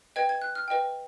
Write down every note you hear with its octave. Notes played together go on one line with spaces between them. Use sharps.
B4 D#5 G5 G#6
G#6
F#6
F6
B4 D#5 G5